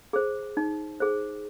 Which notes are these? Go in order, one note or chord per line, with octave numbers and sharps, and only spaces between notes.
G#4 C5
D#4
G#4 C5